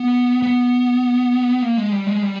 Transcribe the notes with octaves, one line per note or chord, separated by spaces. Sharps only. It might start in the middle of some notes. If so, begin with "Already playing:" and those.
Already playing: B3
B3
A#3
G#3
G3
G#3
G3